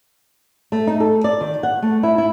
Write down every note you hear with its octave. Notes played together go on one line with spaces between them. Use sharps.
A3
D#4
A4
D5
D#3
F#5
A3
E4
E4